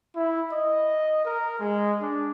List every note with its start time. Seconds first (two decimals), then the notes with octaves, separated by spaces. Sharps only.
0.15 E4
0.52 D#5
1.24 A#4
1.59 G#3
2.00 D4